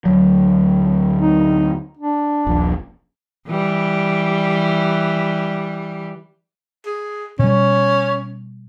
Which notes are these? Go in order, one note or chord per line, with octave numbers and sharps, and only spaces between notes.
D2 F#3
D#4
D4
D#1 A#1
E3 G3
G#4
B2 G3 C#4